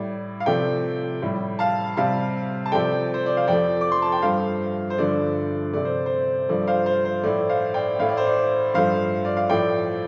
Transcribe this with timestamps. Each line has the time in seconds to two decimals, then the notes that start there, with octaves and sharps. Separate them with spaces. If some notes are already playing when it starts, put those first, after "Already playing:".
Already playing: A2 G3 D5
0.40 F5
0.46 C3 F3 A3 D5 G5
1.22 A2 G3
1.59 F5 A5
1.97 C3 G3 F5 A5
2.66 A5
2.72 C3 F3 A3 D5 G5
3.14 C5
3.26 D5
3.37 F5
3.47 F2 F3 A3 D5 G5
3.81 D6
3.92 C6
4.02 A5
4.12 G5
4.22 G2 F3 A3 C5 F5
4.90 C5
4.98 G2 D3 F3 A3 D5
5.73 C3 A3 D5
5.85 C5
6.06 C5
6.49 G2 F3 A3 D5
6.67 C5 F5
6.86 C5
7.05 C5
7.24 A2 A3 D5
7.49 C5 F5
7.74 D5 G5
7.99 A2 A3 F5
8.09 D5
8.17 C5
8.26 D5
8.74 G2 F3 A3 C5 F5
9.25 D5
9.37 F5
9.50 A2 F3 A3 D5 G5